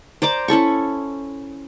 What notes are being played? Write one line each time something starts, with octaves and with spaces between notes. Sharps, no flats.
C5 D5 A#5 D6
C#4 E4 A4 C#6